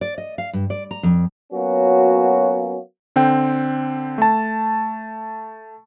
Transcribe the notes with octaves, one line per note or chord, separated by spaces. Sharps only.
D5
D#5
F5
G2
D5
A#5
F2
F#3 A#3 B3 C#4 F4 F#4
D3 C4 G5
A3 A5